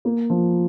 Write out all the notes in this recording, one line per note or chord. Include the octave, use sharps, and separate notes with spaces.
A#3
F3